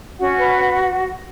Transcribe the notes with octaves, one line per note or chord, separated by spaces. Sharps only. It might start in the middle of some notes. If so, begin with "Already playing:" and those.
C#4 F#4 F#5
B4